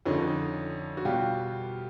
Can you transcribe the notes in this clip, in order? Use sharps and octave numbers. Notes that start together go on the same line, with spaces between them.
F2 D3 F3 C#4 D#4
F#4
B2 G3 F4 G4